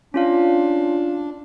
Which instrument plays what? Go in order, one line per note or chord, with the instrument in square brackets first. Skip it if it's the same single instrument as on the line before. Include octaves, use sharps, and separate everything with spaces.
[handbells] C#4 F4 F5 [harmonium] D4